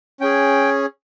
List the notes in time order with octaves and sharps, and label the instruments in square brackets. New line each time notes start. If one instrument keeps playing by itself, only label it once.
[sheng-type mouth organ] C#4 G#4 G5